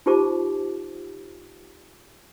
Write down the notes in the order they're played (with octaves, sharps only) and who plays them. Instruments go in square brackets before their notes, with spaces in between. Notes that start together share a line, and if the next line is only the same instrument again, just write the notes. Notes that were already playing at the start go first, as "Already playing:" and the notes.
[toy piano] D#4 F4 G4 C5 A5 D6